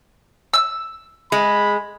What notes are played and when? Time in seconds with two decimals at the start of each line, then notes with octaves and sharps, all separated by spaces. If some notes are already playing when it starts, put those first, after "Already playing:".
0.53 E6
1.32 G#3 B5